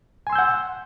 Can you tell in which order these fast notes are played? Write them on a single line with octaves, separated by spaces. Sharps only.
G#5 C6 E6 G6 F#5